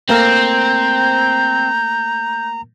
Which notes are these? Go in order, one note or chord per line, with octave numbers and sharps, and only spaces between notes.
A3 A#3 C4 A#4 A#5 G6